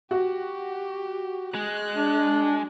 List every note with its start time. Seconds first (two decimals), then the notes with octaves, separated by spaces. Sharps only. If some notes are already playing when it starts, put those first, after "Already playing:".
0.11 F#4 G4
1.55 G#3 F#6
1.96 D4